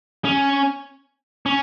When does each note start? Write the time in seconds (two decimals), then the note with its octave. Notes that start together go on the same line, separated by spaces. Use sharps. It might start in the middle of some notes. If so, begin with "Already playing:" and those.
0.25 C#4
1.46 C#4